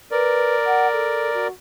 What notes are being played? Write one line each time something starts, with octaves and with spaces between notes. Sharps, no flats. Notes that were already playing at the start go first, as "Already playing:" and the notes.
A#4 B4 D5
F#5
A4
F#4